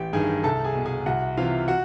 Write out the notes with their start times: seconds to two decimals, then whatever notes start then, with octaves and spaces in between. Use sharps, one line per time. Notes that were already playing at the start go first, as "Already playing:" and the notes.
Already playing: A1 G4 G5
0.13 G2 D#3 G#4 G#5
0.44 C2 A4 A5
0.64 G#4 G#5
0.75 B2
0.86 G#4 G#5
1.06 C2 F#4 F#5
1.37 C3 E3 F4 F5
1.68 F#4 F#5